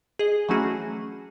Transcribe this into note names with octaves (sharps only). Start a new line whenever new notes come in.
G#4 D#5
E3 F#3 A3 C#4 F#4 G#4